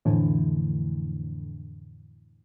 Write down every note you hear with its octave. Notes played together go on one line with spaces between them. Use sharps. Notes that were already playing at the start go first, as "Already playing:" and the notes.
F2 A2 D3 E3